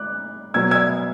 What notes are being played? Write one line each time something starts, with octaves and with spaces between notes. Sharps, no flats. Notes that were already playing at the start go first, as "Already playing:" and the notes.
Already playing: D6 F#6
B2 F#3 B3 E6 G#6
E6 G#6